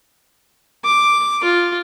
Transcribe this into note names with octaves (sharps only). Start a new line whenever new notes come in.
D6
F4